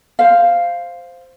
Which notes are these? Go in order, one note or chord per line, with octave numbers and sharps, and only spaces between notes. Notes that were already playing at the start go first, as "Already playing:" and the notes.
C5 F5